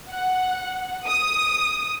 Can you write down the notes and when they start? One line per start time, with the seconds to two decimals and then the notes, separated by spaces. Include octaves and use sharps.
0.11 F#5
1.07 D#6